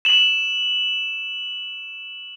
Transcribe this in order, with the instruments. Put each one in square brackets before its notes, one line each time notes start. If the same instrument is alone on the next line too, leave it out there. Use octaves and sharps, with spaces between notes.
[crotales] E7 F#7